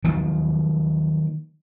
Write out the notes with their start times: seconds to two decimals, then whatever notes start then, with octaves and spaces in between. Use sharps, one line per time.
0.04 D#3 F3 F#3 A#3